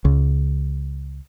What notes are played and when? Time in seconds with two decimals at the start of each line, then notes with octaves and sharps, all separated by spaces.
0.05 C#2